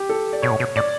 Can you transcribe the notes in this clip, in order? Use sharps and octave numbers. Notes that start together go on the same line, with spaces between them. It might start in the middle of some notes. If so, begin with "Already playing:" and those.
Already playing: G4
A4
D5
B2 C#5
A2
B2
A2 D5